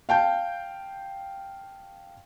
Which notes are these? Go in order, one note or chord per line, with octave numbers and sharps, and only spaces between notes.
F5 G5 A5 G6